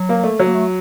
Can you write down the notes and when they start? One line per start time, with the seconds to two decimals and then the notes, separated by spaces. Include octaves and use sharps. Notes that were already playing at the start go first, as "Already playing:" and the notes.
Already playing: F#3
0.09 A#3
0.24 A3
0.39 F#3
0.47 A#3
0.54 A3